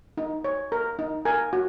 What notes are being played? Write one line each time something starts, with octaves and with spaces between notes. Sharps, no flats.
D#4
C#5
A#4
D#4
A#4 G#5
F#4